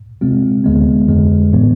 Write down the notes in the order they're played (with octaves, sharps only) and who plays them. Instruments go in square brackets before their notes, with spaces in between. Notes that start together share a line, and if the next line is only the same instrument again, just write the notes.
[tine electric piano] C3 G#3 C4 F4
D2 D3 G#3 B3
F2 D3 G#3
A2 E3 B3